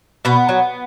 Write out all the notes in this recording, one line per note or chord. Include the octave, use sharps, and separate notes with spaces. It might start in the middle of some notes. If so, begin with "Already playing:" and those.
B2 B3
F#3